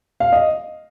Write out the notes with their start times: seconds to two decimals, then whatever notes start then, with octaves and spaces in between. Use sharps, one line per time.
0.20 F5
0.32 D#5